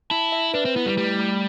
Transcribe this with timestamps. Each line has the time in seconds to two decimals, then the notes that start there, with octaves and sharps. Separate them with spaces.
0.10 E4 A5
0.32 E5
0.54 D4 B4
0.65 C4
0.75 B3 E4
0.86 G3
0.97 G3 A3
1.19 A3